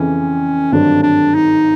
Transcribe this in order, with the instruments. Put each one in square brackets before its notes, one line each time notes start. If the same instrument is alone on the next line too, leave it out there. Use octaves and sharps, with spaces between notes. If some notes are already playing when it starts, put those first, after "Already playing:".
Already playing: [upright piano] F2 C#3 E3 [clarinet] C#4
[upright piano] G#1 G2 D3 F#3 [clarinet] D4
[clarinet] D4
D#4